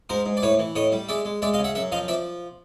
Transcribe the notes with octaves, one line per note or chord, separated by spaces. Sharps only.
G#2 A#4 C5
G#2
D5
A2 B4 C#5
E3
A2 C#5 D#5
G3
G#3 D5 E5
G#3
G#3 D5 E5
D#5 F5
C#3
E5 F#5
F#2 E5 F#5
F3 D#5 F5
F3 D5 E5